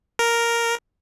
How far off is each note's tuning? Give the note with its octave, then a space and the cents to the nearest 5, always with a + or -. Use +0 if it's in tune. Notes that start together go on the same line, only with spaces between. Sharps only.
A#4 +0